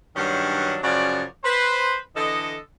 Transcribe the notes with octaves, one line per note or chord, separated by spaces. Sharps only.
G2 D#3 F#3 C#4 D4 F#5
F#2 C#3 F3 F#4 D5
B4 C5
D3 E3 A4 D#5